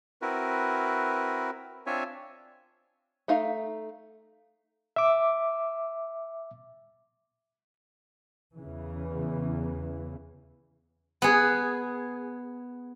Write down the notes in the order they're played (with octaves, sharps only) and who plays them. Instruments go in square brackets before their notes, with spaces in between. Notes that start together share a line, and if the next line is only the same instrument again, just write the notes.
[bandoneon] C4 E4 F#4 A#4 B4
C4 D4 F4 C#5 E5 G#5
[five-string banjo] A3 D#4 E5 F5
[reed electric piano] E5 D6
[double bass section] E2 C#3 E3
[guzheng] B3 G#4